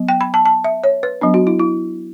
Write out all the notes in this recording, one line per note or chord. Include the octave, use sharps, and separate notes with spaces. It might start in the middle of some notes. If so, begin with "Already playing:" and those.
Already playing: F#3 B3
G5
B5
A5
A5
E5
C#5
B4
F#3 B3 D4
F#4
E4
E4